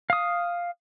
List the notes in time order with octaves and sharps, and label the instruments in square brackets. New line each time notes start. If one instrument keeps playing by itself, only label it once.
[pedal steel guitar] F5 D#6